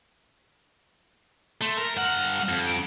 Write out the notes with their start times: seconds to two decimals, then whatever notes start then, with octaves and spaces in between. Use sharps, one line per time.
1.61 A3 C6
1.77 A#4
1.96 G2 F#5 F6
2.49 F2
2.67 D7